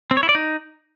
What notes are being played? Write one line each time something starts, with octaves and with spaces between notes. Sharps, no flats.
C4
C#5
E4
D5
D#4